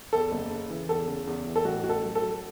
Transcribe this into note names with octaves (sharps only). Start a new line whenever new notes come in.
E2 A4
F#1
C#3
E3
E2 A4
C#3
E2
E3
A4
A1 F#4
A1 F#4
A4
F#3
A4
F#3